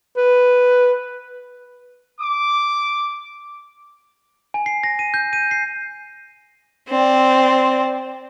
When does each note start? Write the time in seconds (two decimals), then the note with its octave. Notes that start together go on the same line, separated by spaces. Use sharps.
0.17 B4
2.21 D6
4.54 G#5
4.66 C7
4.83 A#6
4.99 D#7
5.14 G6
5.33 D#7
5.51 C7
6.89 C4 D5